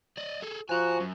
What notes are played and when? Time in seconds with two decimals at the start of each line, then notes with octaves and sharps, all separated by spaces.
0.18 D5 D#5
0.43 G#4 A4
0.69 F3 F#4 G#5 A#5
1.00 F#2